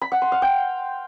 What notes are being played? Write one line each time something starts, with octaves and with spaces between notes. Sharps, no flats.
B5
F#5
C6
F5
G5